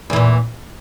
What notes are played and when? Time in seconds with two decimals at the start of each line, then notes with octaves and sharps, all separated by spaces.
0.10 E2
0.13 E3
0.16 A#2